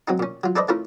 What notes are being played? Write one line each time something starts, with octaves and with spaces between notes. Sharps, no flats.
F#3 C4 D#4
A#2 C#4
F#3 F4
D4 A4 B4 C5 D5 D#5
A3 C#4 E4 F4 A#4